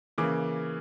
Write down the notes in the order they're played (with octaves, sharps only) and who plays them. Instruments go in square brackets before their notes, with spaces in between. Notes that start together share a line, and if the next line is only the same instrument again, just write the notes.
[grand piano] C#3 E3 A#3 D6